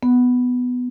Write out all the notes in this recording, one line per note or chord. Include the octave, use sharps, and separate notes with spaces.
B3